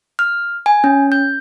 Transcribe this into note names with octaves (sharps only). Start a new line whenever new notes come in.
F6
G#5
C#4
G6